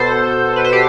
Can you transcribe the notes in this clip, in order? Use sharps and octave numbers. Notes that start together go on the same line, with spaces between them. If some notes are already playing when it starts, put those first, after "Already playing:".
Already playing: B2 B3 A4 C5
B4
C5
G4 B4